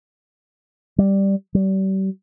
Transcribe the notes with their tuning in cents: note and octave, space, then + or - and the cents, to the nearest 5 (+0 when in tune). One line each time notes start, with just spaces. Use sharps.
G3 +0
G3 -35